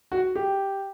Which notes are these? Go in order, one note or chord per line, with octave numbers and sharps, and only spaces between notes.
F#4
G4